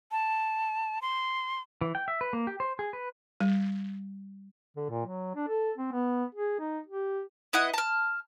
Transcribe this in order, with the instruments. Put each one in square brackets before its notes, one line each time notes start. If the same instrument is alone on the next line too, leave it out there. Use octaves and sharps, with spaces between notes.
[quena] A5
C6
[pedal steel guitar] E3
G5
E5
B4
A#3
G4
C5
G#4
B4
[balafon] G3
[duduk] D3
A#2
F#3
D4
A4
C4
B3
G#4
D#4
G4
[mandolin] B3 E4 D#5 F#5
A5 F6